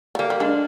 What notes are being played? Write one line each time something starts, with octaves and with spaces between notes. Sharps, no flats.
F3
G3 A#3
G3
G#3 D4